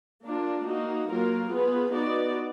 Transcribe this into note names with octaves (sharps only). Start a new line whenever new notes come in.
A#3 D4 F4
A#3 D#4 F#4
F#3 A#3 F4 A#4
B3 F4 G#4 B4
B3 D#4 F#4 D5